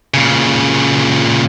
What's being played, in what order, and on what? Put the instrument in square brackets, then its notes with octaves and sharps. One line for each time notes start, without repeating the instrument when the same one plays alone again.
[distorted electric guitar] A#2 C#3